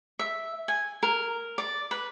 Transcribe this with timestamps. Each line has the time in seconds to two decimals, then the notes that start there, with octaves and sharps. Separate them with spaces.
0.19 E5
0.68 G#5
1.03 A#4
1.58 D5
1.91 B4